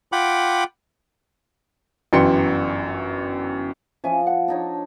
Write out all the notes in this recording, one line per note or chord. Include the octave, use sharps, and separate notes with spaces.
F4 F#5 G5 B5 D6
G1 F#2 E3 G5 C6 C#7
F3 C#4 E5 G#5
F#5
D4 D#4 C#5